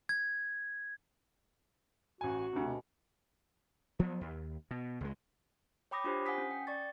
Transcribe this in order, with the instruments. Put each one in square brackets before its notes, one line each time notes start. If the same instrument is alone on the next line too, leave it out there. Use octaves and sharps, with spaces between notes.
[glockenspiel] G#6
[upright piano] A1 G#5 [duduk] F#4
[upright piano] D2 C3
[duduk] B2
[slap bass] F3 F#3 B3
D#2
B2
C#2 G#3
[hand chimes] C#5 G5 B5 D6 D#6 A#6
D4 F4 G4 C5
F#5 G#5 D#6 B6
C#4
G5
D5 C#6 A6